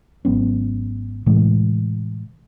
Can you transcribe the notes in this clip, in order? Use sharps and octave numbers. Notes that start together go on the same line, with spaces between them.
G#1 F#3 B3 C#4
A2 C3 E3 G#3